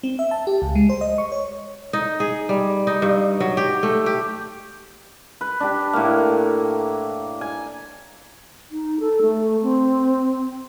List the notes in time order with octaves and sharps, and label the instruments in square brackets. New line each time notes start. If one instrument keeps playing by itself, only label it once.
[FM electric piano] C4
E5
A5
G4
C#2
G#3
C5
D#5
C#6
C#5
[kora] D#4
G#4
G3
D#4
G2
F#3
G4
A3
G4
[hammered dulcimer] B4
D4 G4
A2 A#3
G#5
[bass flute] D#4
A4
A3
C4